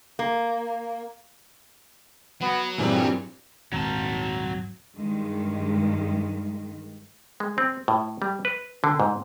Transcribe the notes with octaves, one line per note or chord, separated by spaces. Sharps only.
A#3
F#3 B3
G2 A#2 E3 G3 C4 G#4
D#1 G#2 D#3 F#3 C4 A5 A#5
G2 D#3 G#3
G#3
C4
A2
G3
B4
D3
G#2